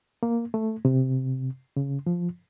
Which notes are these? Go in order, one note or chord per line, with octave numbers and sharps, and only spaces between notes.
A#3
A3
C3
C#3
F3